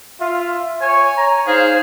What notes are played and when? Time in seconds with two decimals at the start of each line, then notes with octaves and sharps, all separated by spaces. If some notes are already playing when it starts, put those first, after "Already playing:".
0.21 F4 E5
0.82 C#5 G#5
1.17 C#5 A#5
1.47 D#4 G#4 C5 F5